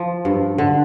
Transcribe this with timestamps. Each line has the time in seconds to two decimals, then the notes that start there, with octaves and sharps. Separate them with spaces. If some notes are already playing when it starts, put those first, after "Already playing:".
Already playing: F3
0.25 G2
0.58 D3